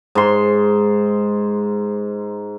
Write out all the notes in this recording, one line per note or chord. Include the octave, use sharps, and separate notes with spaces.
G#2 C6